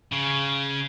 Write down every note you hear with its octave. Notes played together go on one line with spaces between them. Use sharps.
C#3